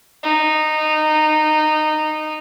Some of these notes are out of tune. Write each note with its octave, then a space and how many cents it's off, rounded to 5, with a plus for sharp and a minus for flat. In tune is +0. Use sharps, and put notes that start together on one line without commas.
D#4 -15